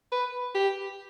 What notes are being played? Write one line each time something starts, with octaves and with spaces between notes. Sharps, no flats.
B4
G4